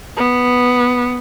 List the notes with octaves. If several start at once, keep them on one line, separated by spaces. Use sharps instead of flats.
B3